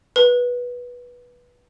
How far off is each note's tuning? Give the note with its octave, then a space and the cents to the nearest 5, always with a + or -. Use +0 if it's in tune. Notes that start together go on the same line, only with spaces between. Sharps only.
B4 -15